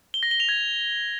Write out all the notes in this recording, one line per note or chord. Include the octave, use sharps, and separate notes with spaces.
G7
A#6
G7
F7
G#6